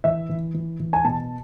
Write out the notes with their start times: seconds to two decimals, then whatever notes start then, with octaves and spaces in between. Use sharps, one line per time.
0.04 E3 E5
0.29 E3
0.54 E3
0.80 E3
0.93 G#5
1.04 B2 A5